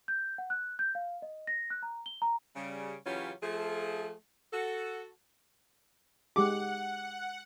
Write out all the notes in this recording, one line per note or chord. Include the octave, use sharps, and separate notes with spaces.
G6
F#5
F#6
G6
F5
D#5
A#6
F#6
A#5
G7
A#5
C#3 G3
C#3 E3 F#3 C#4 F4 G4
F3 A3 G#4
F#4 A4
G#3 G4 G#4 F#5 D6